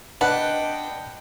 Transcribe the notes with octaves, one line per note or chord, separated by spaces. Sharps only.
D4 B4 D#5 F#5 G5